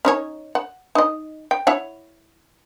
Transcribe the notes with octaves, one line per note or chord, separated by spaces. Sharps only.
C#4 D#4 C#5
F#5
D#4 D#5
G5
E4 C#5 F#5